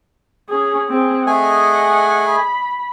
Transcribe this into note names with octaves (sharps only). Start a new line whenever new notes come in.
C#4 G#4
C4 G#4
A3 G#4 D#5 F#5 G#5
B5